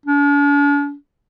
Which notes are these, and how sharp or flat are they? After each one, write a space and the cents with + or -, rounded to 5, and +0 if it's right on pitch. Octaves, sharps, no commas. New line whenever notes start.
D4 -45